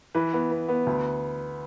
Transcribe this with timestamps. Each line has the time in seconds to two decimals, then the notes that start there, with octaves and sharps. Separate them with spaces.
0.15 E3 B4
0.33 B3
0.51 B3
0.68 B3
0.86 D2